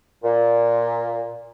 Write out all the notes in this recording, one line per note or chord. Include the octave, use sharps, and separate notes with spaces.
A#2